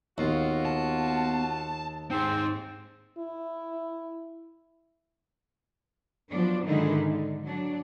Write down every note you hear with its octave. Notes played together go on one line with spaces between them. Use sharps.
D#2 B3 F4 F#4
A5
G#2 C4 D#4 G#4
E4
F3 F#3 B3 D4
G#2 D3 D#3 G#3 D#4 E4
D3
F#3 D4